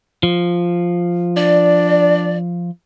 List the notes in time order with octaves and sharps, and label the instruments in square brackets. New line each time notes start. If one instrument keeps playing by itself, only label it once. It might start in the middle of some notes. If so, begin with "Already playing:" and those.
[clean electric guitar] F3
[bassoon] D4 [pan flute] D5